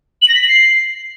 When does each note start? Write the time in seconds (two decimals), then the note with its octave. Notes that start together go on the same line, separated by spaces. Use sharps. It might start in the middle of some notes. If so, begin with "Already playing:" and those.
0.22 F#7
0.28 A#6
0.35 B6
0.41 F#7
0.48 C7